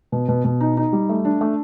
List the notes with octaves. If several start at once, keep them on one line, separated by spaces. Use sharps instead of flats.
B2
B2
B2
D#4
D#4
G3
A3
D4
A3